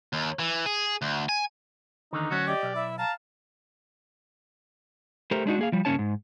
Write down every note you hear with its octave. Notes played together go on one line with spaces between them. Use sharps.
D#2
E3
G#4
D2
G#5
E2 D3 D#3 D#4
D2 F#3 C#4 F#4
G4 D5 D#5
B1
E4 E5
F5 A5 A#5
A3 G4 A#4 C5
G#3 D4 D#4 F#4
A#3 G#4 F5
F3 G3
G2 C#3 A#3 C#4 C#5 A5
G#2